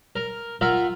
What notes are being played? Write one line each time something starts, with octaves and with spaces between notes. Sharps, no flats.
A#4
F4 A#4 E5 F#5